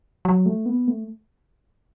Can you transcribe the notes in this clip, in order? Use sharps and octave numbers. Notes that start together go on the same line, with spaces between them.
F#3
A3
B3
A3